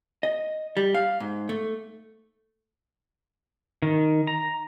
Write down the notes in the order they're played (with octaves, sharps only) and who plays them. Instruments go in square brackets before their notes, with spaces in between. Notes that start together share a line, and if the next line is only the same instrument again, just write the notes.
[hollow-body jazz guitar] D#5
G3
F5
G#2
A3
[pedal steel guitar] D#3
A#5